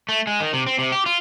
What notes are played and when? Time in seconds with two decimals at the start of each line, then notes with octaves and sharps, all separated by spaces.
0.09 A3
0.27 G#3
0.41 D#3
0.53 C3
0.67 C4
0.78 C3
0.92 G4
1.06 F4